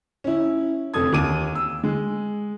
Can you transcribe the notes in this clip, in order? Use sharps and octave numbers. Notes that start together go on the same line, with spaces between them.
C#4 E4
F1 A4 D#6 G#6
D#2 D#4 D6 D#7
E6
G#3